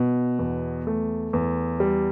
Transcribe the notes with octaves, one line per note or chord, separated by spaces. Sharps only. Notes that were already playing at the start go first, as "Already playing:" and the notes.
Already playing: B2
E2
A3
E2
G3